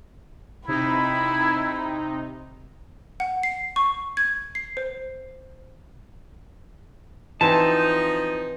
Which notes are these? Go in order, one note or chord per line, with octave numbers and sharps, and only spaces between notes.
C3 D#4 E4 B5
F#5
C7
C#6
G#6
C7
C5
E3 F3 C4 D#4 A5